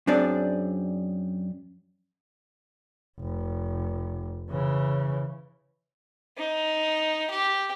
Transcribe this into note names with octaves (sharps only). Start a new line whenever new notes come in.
F#2 C4 D4 G#4 D5
F1
C#3 E3
D#4
G4